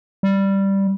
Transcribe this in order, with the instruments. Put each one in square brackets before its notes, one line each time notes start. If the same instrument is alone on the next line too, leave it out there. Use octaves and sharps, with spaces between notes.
[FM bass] G3